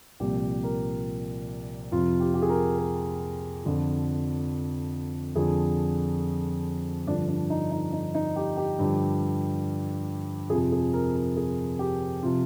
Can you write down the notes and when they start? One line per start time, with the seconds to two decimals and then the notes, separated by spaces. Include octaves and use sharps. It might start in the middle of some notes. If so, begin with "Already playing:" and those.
0.20 C2 A#2 F3 G4
0.63 A#4
1.92 F2 C3 F3 F4
2.20 G4
2.34 G4
2.42 G#4
2.49 A#4
2.78 A#4
3.64 F2 D3 F3
5.35 F2 D3 F3 G#4
7.07 G2 D3 F3 D4
7.28 D4
7.50 D#4
7.72 D#4
7.93 D#4
8.15 D#4
8.36 G4
8.57 G4
8.79 G2 D3 F3
10.50 F2 C3 F3 G#4
10.72 G#4
10.93 A#4
11.15 A#4
11.37 G#4
11.79 G4
12.23 C3 F3 F4